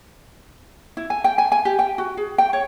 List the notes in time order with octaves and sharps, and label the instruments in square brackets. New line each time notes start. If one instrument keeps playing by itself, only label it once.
[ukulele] E4
G#5
G5
G#5
G#5
G4
G5
F#4
G#4
G5
C#5